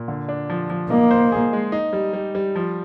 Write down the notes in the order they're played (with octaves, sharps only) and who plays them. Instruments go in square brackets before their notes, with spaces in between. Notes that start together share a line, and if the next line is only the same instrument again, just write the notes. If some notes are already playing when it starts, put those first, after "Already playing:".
Already playing: [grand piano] A#2
D3
D4
F3
F3
[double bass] A#3 [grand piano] D#4
[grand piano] C5
G#4
G#3
D#4
G3
G3
G3
F3